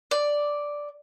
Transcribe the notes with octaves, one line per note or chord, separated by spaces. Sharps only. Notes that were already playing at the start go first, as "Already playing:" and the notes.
D5